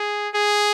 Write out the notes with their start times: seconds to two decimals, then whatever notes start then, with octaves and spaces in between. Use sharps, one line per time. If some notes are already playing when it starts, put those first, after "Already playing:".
Already playing: G#4
0.34 G#4